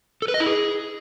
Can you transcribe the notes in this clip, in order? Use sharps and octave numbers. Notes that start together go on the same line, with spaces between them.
A4
B4
D#5
E4
G#4